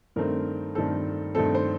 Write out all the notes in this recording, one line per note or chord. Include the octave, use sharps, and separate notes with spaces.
G2 D#3 A3 C4 A#4
G2 D#3 A3 C4 A4
G2 D#3 A3 C4 A4
C5